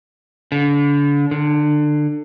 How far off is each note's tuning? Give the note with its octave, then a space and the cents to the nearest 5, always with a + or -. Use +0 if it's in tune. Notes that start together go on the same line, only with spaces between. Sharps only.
D3 -35
D3 +25